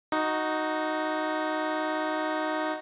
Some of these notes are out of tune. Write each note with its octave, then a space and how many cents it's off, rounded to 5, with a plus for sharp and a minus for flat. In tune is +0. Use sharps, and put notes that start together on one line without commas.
D#4 +0 F#4 +0